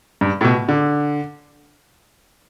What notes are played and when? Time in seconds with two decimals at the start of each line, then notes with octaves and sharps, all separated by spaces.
0.21 G2
0.41 A2
0.44 B2
0.69 D3